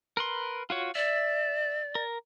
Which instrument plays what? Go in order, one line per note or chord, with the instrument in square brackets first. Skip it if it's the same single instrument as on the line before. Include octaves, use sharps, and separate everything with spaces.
[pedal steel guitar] A#4 B4 C6
F4 F#4 C#5
[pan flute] D5 [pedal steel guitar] E5
[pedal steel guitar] A#4